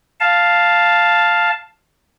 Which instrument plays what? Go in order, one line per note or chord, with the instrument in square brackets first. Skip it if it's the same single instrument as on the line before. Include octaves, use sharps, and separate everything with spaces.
[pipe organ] F5 A5